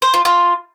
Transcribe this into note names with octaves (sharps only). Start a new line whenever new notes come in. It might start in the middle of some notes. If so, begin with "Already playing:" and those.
C5
F4
F4